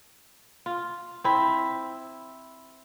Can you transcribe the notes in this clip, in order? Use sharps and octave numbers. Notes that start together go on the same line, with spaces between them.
F4
C4 E4